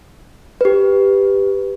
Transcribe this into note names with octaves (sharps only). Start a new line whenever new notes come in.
G4 B4